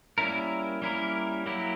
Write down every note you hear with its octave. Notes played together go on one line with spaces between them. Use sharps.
G3 A#3 C#4 E4 A#4
G3 A#3 C#4 E4 A#4
F#3 A#3 E4 G4